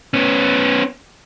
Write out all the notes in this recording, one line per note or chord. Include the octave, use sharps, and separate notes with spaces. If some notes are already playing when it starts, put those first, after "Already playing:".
B3 C#4